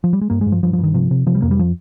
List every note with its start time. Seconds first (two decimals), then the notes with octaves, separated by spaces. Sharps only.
0.04 F3
0.13 G3
0.21 G#3
0.30 G2 A#3
0.41 G#3
0.46 G2
0.52 F3
0.63 G2 F3
0.73 F3
0.78 G2
0.83 D#3
0.94 C3 F3
1.11 C3
1.26 C3 F3
1.35 G3
1.42 F2 A#3
1.51 G3
1.59 F3